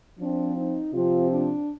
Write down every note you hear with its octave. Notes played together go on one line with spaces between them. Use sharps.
F3 C4 D4
D#4
C3 F3 C4 F4
D4